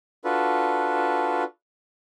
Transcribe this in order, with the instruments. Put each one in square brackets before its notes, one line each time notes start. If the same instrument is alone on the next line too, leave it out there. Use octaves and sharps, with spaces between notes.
[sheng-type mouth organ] D4 F4 F#4 A4 B4